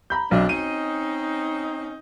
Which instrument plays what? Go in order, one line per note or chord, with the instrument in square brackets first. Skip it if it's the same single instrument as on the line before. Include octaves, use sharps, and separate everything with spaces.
[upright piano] A#5 B5 G6
[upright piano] B1 [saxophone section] C4 D4
[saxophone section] C4 C#4 D#4 [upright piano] D#7